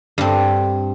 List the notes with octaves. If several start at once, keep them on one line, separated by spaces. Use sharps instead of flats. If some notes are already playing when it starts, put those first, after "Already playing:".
G2 C4